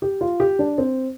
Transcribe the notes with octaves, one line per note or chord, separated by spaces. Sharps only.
G4
F4
G4
D4
C4